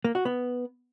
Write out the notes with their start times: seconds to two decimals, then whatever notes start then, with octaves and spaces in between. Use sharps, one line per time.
0.04 A#3
0.15 F#4
0.25 B3